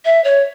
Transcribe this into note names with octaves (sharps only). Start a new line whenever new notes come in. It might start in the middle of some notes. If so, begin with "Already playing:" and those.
E5
C#5